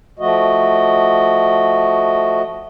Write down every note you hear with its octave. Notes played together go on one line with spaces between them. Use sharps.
F3 A3 F#4 D#5